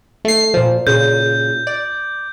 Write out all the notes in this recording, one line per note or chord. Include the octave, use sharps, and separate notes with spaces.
A3 C7
A#2 F3
A#2 C#3 G6
D5